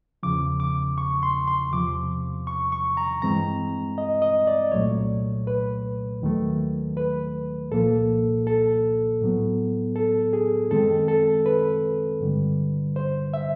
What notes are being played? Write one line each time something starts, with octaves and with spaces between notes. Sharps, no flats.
E2 C#3 F3 D6
D6
C#6
C6
C6
E2 C3 F3 D6
C#6
C#6
A#5
G2 E3 G#3 C4 A#5
D#5
D#5
D5
C2 A#2 F#3 A3 C#5
B4
D#2 D#3 F#3 A3
B4
C2 A#2 F3 A#3 A4
A4
A2 F#3 B3
A4
G#4
F#2 D#3 G#3 C4 A4
A4
B4
G2 D3 G3
C5
E5